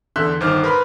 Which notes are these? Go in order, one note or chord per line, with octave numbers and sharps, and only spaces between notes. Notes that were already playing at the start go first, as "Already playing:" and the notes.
E2 D3 E5 C6 F#6 G6
G1 D#3 C5 D6 F6
A#4 B4 B5 C6